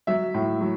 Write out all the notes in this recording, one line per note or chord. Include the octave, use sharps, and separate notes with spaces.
F#3 E5
A2
F#3